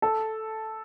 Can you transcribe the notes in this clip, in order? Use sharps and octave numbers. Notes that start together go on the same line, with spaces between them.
A4